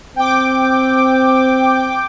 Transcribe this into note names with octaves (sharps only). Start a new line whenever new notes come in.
C4 G5 D6